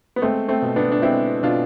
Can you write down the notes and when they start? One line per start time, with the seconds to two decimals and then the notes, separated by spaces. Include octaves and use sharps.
0.16 B3
0.22 G#3 A3 C4
0.48 A3 C4
0.62 B2
0.76 B3 D4
0.91 D4
1.02 G#3 C4 E4
1.43 B2 D4 F4